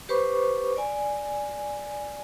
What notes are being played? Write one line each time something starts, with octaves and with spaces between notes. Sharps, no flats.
G4 B4 C5 B5 C#6 D6
D5 G#5